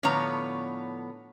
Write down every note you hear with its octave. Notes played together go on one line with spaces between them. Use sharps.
A2 D3 F3 B3 C#5 A#5